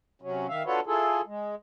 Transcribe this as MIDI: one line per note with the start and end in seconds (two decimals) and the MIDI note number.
0.22 0.47 48
0.22 0.47 54
0.22 0.47 61
0.49 0.63 51
0.49 0.63 76
0.49 0.63 77
0.66 0.80 62
0.66 0.80 65
0.66 0.80 66
0.66 0.80 69
0.66 0.80 71
0.66 0.80 73
0.86 1.21 64
0.86 1.21 65
0.86 1.21 68
0.86 1.21 69
1.26 1.55 56